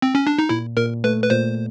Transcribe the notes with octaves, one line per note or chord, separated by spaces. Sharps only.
C4
C#4
D4
D#4
A#2 E4
A#2 A#4
A3 B4
B4
A#2 C5